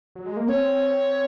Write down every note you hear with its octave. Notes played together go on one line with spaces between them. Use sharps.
F#3
G#3
A#3
C4 C#5